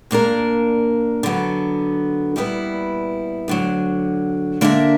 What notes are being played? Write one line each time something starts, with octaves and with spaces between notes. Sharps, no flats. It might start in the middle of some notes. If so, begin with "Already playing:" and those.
A#2 A#3 D4 A#4
D3 F#3 B3
A#2 G3 B3 E4 B4
D2 D3 F#3
D3 A#3 D4 A#4 E5